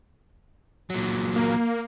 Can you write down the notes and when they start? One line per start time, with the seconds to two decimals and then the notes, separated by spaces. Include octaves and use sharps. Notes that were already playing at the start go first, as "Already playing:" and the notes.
0.90 A#2 F#3
1.36 A#3